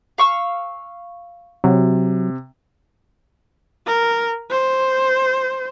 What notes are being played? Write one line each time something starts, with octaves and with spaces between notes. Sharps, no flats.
F5 C#6 E6
C3 F#3
A#4
C5